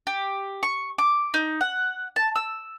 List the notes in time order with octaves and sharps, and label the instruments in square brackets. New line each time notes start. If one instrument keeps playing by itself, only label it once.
[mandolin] G4
C#6
D6
D#4
F#5
A5
E6